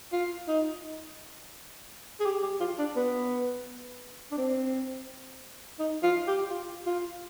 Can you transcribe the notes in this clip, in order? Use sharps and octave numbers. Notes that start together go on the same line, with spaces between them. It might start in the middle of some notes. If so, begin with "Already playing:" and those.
F4
D#4
G#4
G4
G4
F4
D4
B3
D4
C4
D#4
F4
G4
F4
F4